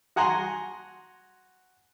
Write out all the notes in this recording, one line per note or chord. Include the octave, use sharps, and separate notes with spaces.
F#4 F#5 G#5 A#5 C6